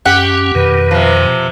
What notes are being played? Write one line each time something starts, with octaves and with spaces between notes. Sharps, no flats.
F#2 C#4 G4 F#5
F2 B2 D#3 B4
C3 F3